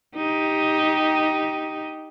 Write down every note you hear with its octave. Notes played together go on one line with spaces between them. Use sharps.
D#4 G4